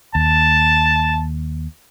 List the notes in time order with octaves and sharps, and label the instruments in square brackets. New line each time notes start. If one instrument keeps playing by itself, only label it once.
[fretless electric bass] D#2 [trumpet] A5